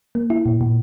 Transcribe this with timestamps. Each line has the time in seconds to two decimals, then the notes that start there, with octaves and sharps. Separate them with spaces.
0.15 A#3
0.30 E4
0.46 A#2
0.61 A#2